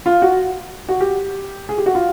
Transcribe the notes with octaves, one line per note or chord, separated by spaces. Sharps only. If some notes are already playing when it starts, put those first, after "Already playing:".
F4
F#4
F#4
G4
G#4
G4
F#4
F4